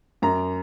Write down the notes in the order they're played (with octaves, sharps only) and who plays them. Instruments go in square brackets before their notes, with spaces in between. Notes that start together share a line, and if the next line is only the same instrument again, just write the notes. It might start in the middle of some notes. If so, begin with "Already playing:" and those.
[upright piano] F#2 A#5